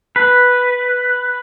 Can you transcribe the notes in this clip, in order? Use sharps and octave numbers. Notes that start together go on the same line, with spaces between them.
B4